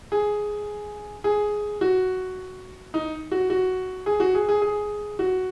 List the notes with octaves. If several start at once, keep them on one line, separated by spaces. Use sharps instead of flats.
G#4
G#4
F#4
D#4
F#4
F#4
G#4
F#4
G#4
G#4
G#4
F#4